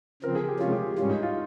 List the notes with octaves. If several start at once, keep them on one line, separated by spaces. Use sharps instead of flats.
C#3 F3 C4 A#4
G#4
G4
C3 F3 G#3 C#4 F4
G4
G#2 G3 C#4 F4
D#4
F4